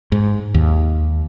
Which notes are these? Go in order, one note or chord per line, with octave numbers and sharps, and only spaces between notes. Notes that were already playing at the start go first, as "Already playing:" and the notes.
G#2
D#2